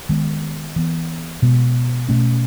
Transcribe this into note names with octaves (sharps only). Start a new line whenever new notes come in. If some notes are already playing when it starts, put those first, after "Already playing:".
D#3 G#3 B3
E3 B3
B2 G#3 B3
B2 A3 C#4